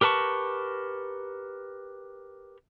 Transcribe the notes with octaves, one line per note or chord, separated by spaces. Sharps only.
G4 A#4 B4 A5 C#6